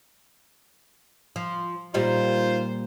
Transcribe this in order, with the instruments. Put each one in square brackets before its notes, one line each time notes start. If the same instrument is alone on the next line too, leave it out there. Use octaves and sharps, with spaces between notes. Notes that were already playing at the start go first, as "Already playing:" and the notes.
[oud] F3
[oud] A#2 G3 D#4 [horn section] F4 C5